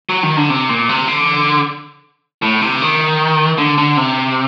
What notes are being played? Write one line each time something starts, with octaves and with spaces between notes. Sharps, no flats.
F#3
D#3
D3
C3
A#2
C3
D3
A2
C3
D#3
D3
D3
C3